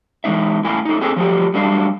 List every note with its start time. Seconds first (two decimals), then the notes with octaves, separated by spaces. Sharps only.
0.24 E3 F3 G#3 D#4 E5
0.64 A2 A3 E4 F5 G#5
0.85 A3 D#4
1.01 C4 G#4 A4 G5 G#5
1.16 F3 F#3 A3 G4
1.54 F#3 G3 A3 D4 F5